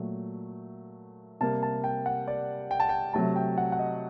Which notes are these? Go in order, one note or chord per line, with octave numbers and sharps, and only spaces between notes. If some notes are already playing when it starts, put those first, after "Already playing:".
Already playing: A#2 F#3 A3
C3 G3 A#3 A5
A5
G5
F#5
D5
G5
A5
G5
C3 F#3 A3 A5
G5
F#5
F#5
D#5